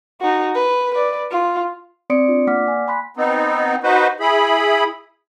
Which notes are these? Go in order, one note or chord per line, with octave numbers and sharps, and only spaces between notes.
D#4 F#4
B4
B4 D5
F4
C4 D5 C6 D#6 C#7 D7
D4 F4
A#3 D5 F#5 D6 F6 B6
G#5
G#5 B5 C6 F#6 B6
B3 C4 D#4
D#4 F#4 B4 C5
E4 G#4 B5